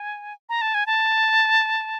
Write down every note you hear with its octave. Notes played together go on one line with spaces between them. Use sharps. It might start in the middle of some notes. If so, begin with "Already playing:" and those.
Already playing: G#5
A#5
A5
G#5
A5